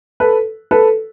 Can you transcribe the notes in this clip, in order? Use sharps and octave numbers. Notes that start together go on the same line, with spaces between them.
A4 B4
A4 B4